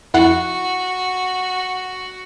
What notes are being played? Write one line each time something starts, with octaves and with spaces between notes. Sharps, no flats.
F2 E4 F#4 F#5